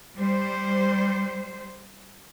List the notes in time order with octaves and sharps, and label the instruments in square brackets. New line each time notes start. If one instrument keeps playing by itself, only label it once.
[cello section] G3 C5